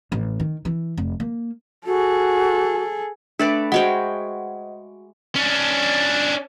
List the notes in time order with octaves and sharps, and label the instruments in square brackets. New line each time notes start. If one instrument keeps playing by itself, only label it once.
[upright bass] A1
D#3
E3
F1
A#3
[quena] F#4 [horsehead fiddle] G#4 A4
[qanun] A3 B4 D5 [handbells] D4 A6
[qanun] G#3 F#4 G5 [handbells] C5 D#5 F#5
[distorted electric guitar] C#4 D4